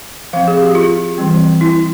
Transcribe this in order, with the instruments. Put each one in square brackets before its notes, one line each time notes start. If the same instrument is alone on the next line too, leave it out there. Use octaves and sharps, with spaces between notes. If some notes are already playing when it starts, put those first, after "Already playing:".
[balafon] F3 C4 F5
G#4
G4
F4
E3 G3 C4
E4